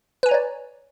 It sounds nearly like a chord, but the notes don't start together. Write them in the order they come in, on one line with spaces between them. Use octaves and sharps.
B4 G#5 A#5 C#5 D5